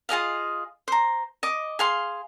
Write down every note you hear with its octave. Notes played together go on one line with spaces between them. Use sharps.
F4 G#4 D#5 F5
C5 A#5
D#5 D6
G#4 F5 C6